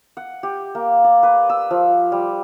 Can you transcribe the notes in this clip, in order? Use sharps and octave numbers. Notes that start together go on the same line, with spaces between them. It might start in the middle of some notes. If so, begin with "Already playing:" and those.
F#5
G4
A#3
D5
B4
E6
F3
G3